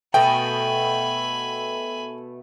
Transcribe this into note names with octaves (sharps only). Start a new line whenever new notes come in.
B2 A3 B3 G5 G#5 B5